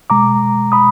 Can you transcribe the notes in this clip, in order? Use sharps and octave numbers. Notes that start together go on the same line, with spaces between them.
B2 G#3 A#5 D6
B5 D#6